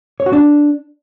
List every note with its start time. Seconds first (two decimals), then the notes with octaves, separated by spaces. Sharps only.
0.20 C#5
0.26 F#4
0.33 D4